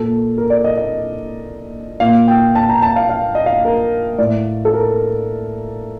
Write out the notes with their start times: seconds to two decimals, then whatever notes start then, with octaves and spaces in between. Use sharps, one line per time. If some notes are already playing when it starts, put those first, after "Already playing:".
Already playing: A#2 A4
0.38 A#4
0.50 D5
0.64 D#5
0.77 D#5
2.00 A#2 F5
2.28 G5
2.55 A5
2.69 A#5
2.82 A5
2.96 F5
3.09 F5
3.35 D#5
3.46 F5
3.65 A#4
4.18 A2 D5
4.65 A4
4.74 A#4